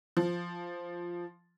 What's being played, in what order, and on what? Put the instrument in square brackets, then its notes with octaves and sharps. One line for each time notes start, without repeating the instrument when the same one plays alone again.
[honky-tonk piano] F3